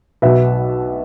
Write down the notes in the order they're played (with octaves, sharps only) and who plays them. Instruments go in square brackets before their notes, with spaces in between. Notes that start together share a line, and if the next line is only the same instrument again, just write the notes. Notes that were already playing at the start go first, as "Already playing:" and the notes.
[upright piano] B1 B2 B4 E5